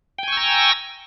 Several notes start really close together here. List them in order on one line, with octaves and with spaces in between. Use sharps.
G5 G#5 C#6 E6 A#5